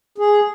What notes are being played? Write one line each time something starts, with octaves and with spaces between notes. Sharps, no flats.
G#4